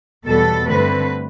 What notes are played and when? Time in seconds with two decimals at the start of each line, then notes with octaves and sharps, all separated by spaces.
0.25 E2 B2 G3 B3 A4
0.67 G2 D3 A3 C4 B4